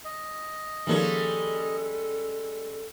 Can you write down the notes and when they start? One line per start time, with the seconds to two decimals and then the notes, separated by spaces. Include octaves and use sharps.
0.05 D#5
0.87 D#3 F3 G3 G#3 A#3 C#4 A4